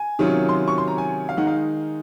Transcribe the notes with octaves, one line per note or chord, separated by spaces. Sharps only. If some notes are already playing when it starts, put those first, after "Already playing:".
Already playing: G#5
C3 D#3 F#3 C#4 F4
C6
C#6
C6
A#5
G#5
F5
D#3 G#3 D#4 F#5
F5